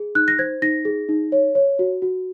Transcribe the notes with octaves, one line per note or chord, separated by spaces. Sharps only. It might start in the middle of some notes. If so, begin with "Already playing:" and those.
Already playing: G#4
D#4 F#6
A#6
C5 G#6
D#4 A#6
G#4
D#4
C#5
C#5
F#4
F#4